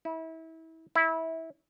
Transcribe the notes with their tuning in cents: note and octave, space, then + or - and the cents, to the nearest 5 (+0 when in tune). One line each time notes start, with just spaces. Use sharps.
E4 -30
E4 -20